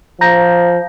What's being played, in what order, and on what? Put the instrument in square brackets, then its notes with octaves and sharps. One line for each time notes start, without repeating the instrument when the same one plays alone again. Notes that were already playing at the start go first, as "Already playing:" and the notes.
[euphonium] F3 [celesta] A#5 G6 A#6